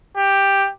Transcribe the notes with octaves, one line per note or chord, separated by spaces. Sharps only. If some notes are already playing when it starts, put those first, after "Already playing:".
G4